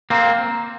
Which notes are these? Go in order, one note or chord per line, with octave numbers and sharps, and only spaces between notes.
A#3 C4